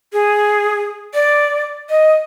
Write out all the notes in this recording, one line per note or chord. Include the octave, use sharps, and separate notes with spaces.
G#4
D5
D#5